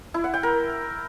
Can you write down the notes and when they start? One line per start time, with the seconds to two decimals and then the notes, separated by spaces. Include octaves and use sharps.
0.14 E4
0.24 F#5
0.34 G5
0.43 A#4